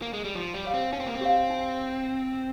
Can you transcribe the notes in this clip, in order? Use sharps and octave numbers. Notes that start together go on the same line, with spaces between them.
A#3
G#3
G3
F3 D#4
G3
G4 C#5 F5
C4
C#4 D#4
C4
A#3
C4
G4 C#5 F5
D#4